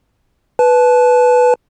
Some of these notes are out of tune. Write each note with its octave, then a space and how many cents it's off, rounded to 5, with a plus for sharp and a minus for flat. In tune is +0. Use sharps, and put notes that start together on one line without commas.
B4 +0 A5 -25